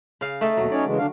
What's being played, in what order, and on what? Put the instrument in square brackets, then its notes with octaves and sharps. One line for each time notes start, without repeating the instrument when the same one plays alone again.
[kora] C#3 F5
A3 D#4 A4
[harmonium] D#2 B2 [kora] F#3
[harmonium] C#4 D#4 C#5 [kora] D5
[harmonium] C#3 E3 G#3
D3 D4 F5